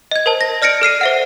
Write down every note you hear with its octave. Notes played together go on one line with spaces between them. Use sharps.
D#5 G#6
A#4 C5 A5
A#6
D5 F6 A#6 C#7 D7
A4 F6 C7 D#7
C5 E5 F#5